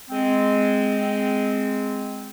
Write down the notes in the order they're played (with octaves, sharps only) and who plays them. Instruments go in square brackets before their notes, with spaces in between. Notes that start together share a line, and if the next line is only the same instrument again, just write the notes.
[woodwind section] G#3 C4